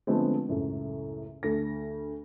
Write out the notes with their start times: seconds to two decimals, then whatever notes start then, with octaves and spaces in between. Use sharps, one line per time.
0.07 D3 F3 G#3 A3 B3 C4
0.49 C#2 F#2 A2
1.43 D2 A3 A#6